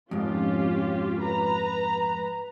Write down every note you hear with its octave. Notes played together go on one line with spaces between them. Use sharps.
F2 G#2 C#4 F4 G4
B4 A#5